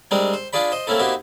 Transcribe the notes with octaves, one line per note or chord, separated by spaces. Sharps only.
G3 G#3 C4 D4 A#4
C5
D4 F4 G#4 D5 B5
C5 D#5
A3 A#3 C4 C#4 E4 A4
A#3 C4 D#4 E4 F#4 G4